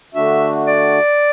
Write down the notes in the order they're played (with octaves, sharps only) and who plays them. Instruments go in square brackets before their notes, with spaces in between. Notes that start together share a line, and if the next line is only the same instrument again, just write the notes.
[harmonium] D3 A3 D4 F#4 [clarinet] E5
[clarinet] D5